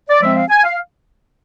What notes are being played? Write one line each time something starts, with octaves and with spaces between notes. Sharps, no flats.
D5
F3 G#3 C4 E5
F5
G#5
F5